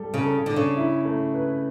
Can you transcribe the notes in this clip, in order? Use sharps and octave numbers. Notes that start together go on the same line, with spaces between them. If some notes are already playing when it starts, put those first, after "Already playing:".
Already playing: G3 A4
C#3
A4
D3 D4
C#3
E4
A3
B4